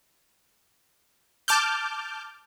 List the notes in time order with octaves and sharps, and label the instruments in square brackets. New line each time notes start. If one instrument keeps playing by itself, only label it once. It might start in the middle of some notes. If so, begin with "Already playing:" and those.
[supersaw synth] A5 D6 F6 G6